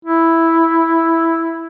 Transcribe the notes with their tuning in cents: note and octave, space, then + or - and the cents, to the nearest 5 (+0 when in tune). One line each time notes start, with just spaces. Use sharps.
E4 +0